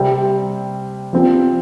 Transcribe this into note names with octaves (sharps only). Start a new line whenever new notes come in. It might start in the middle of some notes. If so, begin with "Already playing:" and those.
Already playing: C3 G3 C4
F3 C4 G4